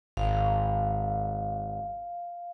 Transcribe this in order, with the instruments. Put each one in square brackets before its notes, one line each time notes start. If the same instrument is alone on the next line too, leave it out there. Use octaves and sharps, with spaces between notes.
[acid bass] G#1 [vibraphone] F5